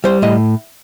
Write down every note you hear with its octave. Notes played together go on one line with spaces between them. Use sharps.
G3 C5
A2 D#5